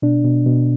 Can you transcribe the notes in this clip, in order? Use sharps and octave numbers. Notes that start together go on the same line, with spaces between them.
B2 D4
B2
B2